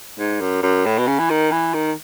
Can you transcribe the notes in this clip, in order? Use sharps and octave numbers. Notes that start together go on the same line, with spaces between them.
G#2
F#2
F#2
A2
B2
C#3
E3
D#3
E3
D#3